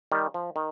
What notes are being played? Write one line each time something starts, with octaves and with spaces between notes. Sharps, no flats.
D#3 G3
F3
D#3